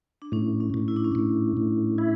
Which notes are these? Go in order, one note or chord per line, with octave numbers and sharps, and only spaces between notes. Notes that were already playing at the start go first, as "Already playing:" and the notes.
D4
A2 C#4
C#4
A2
E4
D4
C#4
A2 D4
A2
E4